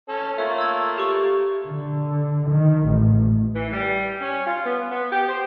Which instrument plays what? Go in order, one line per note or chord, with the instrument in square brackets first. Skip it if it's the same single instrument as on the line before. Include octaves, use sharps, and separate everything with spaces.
[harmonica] C#4 A4
[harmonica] A3 A#3 F4 [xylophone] C#5 E5
[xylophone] E6 G#6
G4 C#6
[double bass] D3
D#3
A1
[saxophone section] E3
G3
C#4
F4
B3
B3
G4
C5